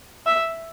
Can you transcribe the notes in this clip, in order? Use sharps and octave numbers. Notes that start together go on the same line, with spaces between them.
E5